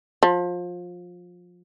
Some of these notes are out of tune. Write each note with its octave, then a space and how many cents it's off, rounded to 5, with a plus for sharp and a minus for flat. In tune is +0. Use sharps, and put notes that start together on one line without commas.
F3 +25